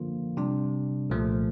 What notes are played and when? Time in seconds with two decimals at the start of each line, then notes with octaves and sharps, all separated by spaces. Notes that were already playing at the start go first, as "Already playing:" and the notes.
Already playing: D3 F3 A#3 F4
0.37 C3 G3 D4
1.10 C2 A#2 F3 A3